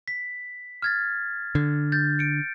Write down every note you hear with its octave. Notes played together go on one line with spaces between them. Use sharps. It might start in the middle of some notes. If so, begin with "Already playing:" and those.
B6
F6 G#6 A6
D3
G6 A6
C#7 D7